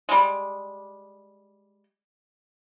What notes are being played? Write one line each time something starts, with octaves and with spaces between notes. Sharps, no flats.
G3 G#3